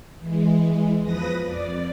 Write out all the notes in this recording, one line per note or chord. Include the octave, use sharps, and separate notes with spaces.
E3 G#3
E2 F3 B4 D#6 A#6
F2 D5